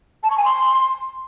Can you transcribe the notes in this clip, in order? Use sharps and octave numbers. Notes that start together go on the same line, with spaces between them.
A5
C#6
G#5
C6